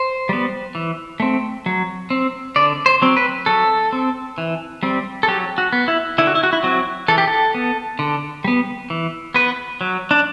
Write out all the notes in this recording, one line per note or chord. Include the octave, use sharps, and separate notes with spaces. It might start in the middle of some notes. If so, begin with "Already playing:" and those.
Already playing: C5
G3 B3
E3
A3 C4
F#3
C4
D3 D5
C5
F#3 C4
B4
F#3 A4
C4
E3
G3 C4
A4
F#3 G4
F#4
B3
E4
D3 E4
F#4
E4
F#4
E4
F#3 C4 F#4
E3 A4
G4
A4
B3
D3
G3 B3
E3
B3 B4
F#3
D4